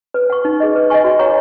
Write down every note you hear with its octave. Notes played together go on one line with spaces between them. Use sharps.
B4
F#5 C#6
D#4
G#4 D#5
B4
D#5 G#5 C#6
F#4
C#5 F#5 A#5 C#6